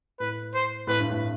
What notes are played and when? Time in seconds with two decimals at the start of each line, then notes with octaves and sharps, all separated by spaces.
0.20 A2 B4
0.54 C5
0.87 A2 B4
1.00 G2
1.10 A2